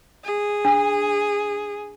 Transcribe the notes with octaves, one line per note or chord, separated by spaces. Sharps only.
G#4
D4